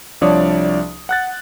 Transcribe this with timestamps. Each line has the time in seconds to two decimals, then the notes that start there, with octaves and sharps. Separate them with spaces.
0.21 C2 F3 D4 C#5 D5 D#6
1.09 F#5 F#6 A6